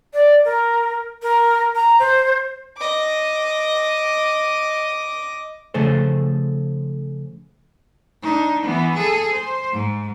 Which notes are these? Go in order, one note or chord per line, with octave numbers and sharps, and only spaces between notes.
D5
A#4
A#4
A#5
C5
D#5 D6
C#3 F3 A3 G#4 A4 C5
D4 D#4
E3 B3
G#4 A4
C5
G#2